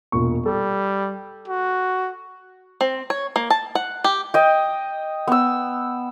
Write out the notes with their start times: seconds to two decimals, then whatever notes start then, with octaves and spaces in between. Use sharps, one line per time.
0.12 E1 A#2 C#6
0.46 G3 A4
1.48 F#4
2.81 C4
3.10 C#5
3.36 A#3
3.50 A5
3.75 F#5
4.04 G4
4.34 D#5 G5
5.28 B3 E6